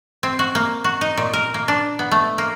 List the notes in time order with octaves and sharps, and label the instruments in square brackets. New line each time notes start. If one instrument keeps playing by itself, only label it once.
[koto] C4
F#4
A#3
F#4
D#4
A#2
A#4
A#3
D4
B3
A3
A#3